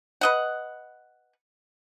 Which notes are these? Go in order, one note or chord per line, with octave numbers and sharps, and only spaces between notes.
B4 D#5 F#5